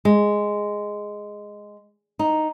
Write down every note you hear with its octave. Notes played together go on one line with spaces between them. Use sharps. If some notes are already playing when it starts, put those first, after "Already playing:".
G#3
D#4